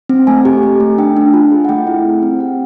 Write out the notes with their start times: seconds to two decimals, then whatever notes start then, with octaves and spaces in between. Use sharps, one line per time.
0.09 C4
0.27 A3 G#5
0.45 G4
0.63 A3
0.80 A3
0.98 D4 G5
1.17 D4
1.34 F4
1.52 G#4
1.65 F#5
1.69 A3 G5
1.87 E4
2.04 C4
2.23 C4
2.40 G4 F#5